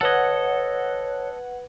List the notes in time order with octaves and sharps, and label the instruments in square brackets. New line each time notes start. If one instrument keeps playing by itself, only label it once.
[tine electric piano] G1 B4 G#6 [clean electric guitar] A4 D#5 [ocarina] C#5 [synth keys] F#5